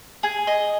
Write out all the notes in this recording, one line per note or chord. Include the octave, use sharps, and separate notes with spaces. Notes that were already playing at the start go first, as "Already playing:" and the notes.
G#4
D#5